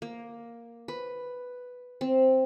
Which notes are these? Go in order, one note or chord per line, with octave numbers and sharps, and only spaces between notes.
A#3
B4
C4